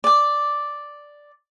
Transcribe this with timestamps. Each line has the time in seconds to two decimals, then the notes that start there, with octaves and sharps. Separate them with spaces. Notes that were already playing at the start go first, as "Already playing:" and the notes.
0.04 D5 D6